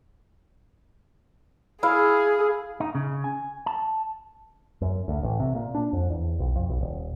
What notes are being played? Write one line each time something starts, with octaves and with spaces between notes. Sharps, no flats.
E4 G#4 F5
D#4
C#3
G#5
A5
F#2
D2
A1
C3
A#2
D4
F2
E2
B1
F2
B1
D#1